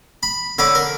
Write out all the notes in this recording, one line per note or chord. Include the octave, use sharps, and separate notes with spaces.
B5
D3 C#5 B5 D6
A#4